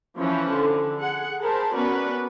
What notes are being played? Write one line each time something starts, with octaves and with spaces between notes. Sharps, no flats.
E3 F3 C#4 E4 B4 C5
D3
G#4 F#5
G#4 A#4 C5 A5 B5
B3 C#4 F#4 A#4 B4 D5